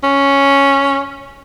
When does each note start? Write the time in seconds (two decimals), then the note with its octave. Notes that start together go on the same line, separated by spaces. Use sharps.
0.03 C#4